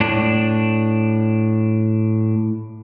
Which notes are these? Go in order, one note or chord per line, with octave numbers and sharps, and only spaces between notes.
A2 D4